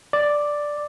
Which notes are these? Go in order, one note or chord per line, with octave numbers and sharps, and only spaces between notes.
D5